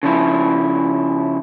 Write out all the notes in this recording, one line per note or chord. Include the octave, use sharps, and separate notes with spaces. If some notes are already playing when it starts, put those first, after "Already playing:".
C#3 F3 E4